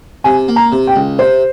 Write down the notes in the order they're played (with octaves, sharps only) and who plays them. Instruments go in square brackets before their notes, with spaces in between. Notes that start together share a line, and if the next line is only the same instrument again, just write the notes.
[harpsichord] C3 [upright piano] G#5
[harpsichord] A#3
[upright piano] A#5
[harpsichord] C3
[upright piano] G5
[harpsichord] C#2
[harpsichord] C3 [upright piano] C5